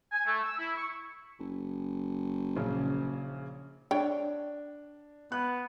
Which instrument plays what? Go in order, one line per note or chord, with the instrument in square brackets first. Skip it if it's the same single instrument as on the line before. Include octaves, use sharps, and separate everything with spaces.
[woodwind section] G#5
A3
E6
E4
C#6
[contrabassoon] F#1
[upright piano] A#1 C#3
[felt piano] D4 [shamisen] C#5 G5
[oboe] B3 [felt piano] F#6